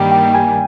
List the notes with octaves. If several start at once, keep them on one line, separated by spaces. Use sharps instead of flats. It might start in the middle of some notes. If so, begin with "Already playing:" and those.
Already playing: G2 D#3 G3 A#3 G5
G5
G#5